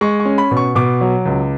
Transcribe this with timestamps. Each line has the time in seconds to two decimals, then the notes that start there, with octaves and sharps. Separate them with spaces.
0.01 G#3 C#6
0.20 C#6
0.25 C#4
0.38 B5
0.51 B2
0.57 C#6
0.75 B2 D6
1.01 F#3
1.26 C#2